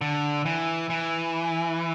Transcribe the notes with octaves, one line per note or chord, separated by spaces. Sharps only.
D3
E3
E3